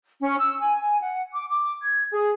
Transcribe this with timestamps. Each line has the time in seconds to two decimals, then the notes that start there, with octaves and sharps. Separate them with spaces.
0.21 C#4
0.38 E6
0.59 G#5
1.01 F#5
1.34 D6
1.49 D6
1.83 G#6
2.11 G#4